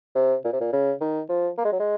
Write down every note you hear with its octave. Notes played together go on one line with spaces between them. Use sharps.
C3
A#2
C3
A#2
C#3
D#3
F3
A#3
G#3
F#3
G#3